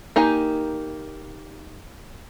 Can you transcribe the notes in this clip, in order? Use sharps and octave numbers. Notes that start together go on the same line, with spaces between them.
A#3 D#4 G4 G#5